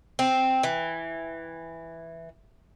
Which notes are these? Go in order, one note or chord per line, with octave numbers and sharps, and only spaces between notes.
C4
E3